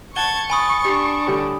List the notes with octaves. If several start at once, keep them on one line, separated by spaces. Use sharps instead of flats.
F#5 A5 C#6 G#6 G7
G#5 B5 D#6 A6
D4 G4
A2 D3 G3